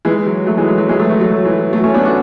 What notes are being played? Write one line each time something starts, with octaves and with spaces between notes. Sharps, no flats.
E3 G#3
F#3
F#3 A3
E3 G#3
F#3
F#3
E3 G#3
F#3 A3
F#3 A3
F#3
F#3
E3
F#3
F#3 A3
A3 C#4
B3 D4
D4 F#4